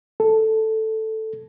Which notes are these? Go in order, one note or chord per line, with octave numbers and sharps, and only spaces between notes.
A4